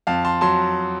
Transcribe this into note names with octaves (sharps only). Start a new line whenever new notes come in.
F2 F5 A5
A5 C6
F#3 A5 C6